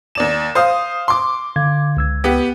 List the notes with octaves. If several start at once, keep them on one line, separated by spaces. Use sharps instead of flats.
D#2 D5 E7
C5 F5 D#6
C6 D6
D3 F5 G#6
C#2 E6 G#6
B3 G4